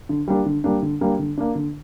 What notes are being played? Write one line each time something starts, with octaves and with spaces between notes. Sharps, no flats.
D3
G3 A#3 D4
D3
G3 A#3 D4
D3
G3 A#3 D4
D3
A#3 D4
D3